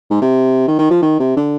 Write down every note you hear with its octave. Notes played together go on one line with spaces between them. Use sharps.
G#2
C3
D#3
D#3
F3
D#3
C3
D3